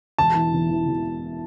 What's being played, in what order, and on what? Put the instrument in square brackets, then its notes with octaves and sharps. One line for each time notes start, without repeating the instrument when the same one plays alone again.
[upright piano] E1 [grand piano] A5
[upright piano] E3
E1
E3
E1